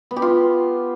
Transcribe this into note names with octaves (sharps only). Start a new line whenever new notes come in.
B3
G4
F4